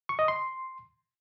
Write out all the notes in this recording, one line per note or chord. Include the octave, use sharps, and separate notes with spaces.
C#6
D#5
C6